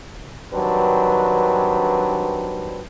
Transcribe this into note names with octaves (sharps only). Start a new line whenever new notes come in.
G2 D#3 F#3 C4 D4 B4